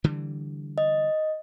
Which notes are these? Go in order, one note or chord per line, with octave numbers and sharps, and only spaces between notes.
D3 E3 G3
D#5